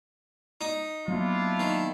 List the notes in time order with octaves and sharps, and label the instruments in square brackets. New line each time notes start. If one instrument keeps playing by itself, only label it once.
[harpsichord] D#4
[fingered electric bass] F#3 A#3 B3 [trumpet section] D4 E4 F4
[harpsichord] D#3